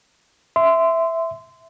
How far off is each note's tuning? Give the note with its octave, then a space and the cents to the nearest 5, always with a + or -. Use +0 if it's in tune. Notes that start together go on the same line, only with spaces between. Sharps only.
E5 +0 C6 -20